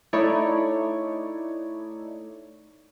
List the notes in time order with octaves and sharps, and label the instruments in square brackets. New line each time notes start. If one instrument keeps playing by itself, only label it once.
[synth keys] A3 D#4 E4 C#5 D5